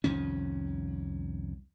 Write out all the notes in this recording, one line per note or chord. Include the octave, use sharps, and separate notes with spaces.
C2 F2 D#3 C#4